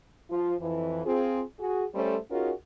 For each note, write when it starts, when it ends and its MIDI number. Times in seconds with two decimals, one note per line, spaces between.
0.30 0.54 53
0.30 0.54 65
0.60 1.03 41
0.60 1.03 52
1.05 1.42 60
1.05 1.42 65
1.05 1.42 68
1.60 1.85 66
1.60 1.85 68
1.95 2.17 55
1.95 2.17 57
1.95 2.17 61
1.95 2.17 69
1.95 2.17 72
2.31 2.52 61
2.31 2.52 63
2.31 2.52 65
2.31 2.52 66
2.31 2.52 68
2.31 2.52 70